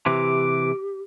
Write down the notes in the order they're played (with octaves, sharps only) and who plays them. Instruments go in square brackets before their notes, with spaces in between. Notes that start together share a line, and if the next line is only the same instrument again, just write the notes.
[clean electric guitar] C3 E3 [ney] G4 [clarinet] D6